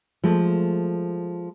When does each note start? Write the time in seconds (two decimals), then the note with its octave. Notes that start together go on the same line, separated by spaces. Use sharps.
0.24 F3 G#3 A3